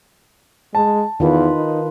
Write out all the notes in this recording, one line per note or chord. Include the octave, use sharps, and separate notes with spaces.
G#3 A5
E2 D#3 F4 B4
D#4